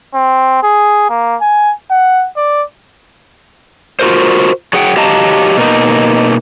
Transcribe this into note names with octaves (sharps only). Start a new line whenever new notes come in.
C4
G#4
A#3
G#5
F#5
D5
F4 F#4 A#4 C5
F#3 G#4 F#5 G5
F#3 G4 D#5 F5 A5 A#5
B2 A#3 D#4